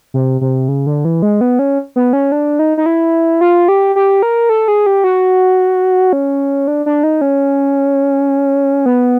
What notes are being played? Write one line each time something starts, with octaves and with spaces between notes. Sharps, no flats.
C3
C3
C#3
D3
E3
G#3
B3
C#4
B3
C#4
D4
D#4
D#4
E4
F4
G4
G4
A#4
A4
G#4
G4
F#4
C#4
D4
D4
D#4
C#4
B3